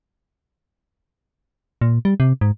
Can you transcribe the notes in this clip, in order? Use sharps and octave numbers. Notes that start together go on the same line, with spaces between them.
A#2
G3
C3
G#2